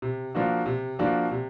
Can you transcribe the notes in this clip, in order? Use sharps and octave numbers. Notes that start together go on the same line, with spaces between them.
C3
F3 A#3 D4 F#4
C3
F3 A#3 D4 F#4
C3